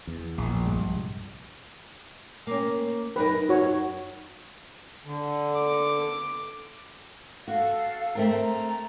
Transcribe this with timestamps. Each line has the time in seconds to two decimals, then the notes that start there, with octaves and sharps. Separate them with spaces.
0.07 E2
0.38 A#1
0.66 C2 G2 G#3
2.47 A#3 C#4
3.16 F#2 D#4 A#4 B4
3.49 F#4 C#5
5.05 D3
5.55 D6
7.48 F#4 A4 F5
8.15 A3 C4 A#4
8.42 A#5